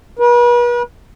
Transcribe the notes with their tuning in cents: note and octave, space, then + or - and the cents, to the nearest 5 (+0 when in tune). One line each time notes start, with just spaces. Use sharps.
B4 -40